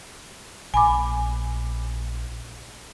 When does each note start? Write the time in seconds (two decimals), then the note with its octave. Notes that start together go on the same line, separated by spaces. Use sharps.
0.74 A#1 G#5 B5 D6